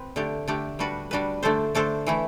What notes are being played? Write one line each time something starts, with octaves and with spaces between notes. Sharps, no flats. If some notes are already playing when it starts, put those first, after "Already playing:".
Already playing: C4 B4
D3 A3 D4 G4
D3 A3 D4 G4
G3 D4 F#4 B4
G3 D4 F#4 B4
D3 A3 D4 A4 C5
D3 A3 D4 A4 C5
E3 A3 E4